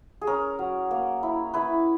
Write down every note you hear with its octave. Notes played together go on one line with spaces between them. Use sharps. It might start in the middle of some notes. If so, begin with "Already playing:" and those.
G#4
C#4 A#4
F#3
A#3
E4
E4 B4